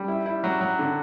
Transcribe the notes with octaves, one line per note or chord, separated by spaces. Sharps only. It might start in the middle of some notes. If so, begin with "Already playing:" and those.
Already playing: G3
E4
E4
F#3
F#3
D3